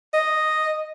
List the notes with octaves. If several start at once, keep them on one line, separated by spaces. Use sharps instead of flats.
D#5